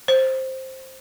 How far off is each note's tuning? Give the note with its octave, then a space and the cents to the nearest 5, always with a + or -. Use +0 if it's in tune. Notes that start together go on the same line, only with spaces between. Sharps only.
C5 +10